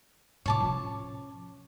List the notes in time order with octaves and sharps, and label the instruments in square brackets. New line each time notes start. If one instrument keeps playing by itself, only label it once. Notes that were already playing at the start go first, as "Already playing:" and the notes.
[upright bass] A2 C3 [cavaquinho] C#5 A5 D6
[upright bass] F3 C#4